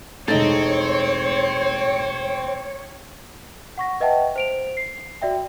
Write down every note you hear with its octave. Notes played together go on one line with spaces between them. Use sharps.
E1 A3 C4 D#4 C#5 A6
F#5 C#6 A#6
B4 D#5 E5 F#5 G5 A5
C5 D7 F7
C7
F#4 D5 E5 G5